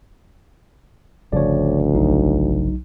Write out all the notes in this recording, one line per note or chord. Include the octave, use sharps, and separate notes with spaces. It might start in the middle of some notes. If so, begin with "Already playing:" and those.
G1 D2 C#3 F3 C#5 D5
B1 F#3 D#4